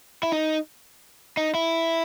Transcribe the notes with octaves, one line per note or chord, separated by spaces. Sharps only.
E4
D#4
D#4
E4